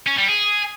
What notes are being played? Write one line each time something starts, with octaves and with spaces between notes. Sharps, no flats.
C#4
G3
G#4